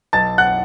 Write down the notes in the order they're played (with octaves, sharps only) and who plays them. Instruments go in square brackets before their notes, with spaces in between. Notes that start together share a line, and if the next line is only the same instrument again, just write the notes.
[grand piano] B1 A5 A6
F#5 F#6